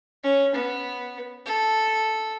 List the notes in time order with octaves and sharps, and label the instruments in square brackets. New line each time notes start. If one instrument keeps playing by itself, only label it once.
[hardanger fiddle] C#4
B3
A4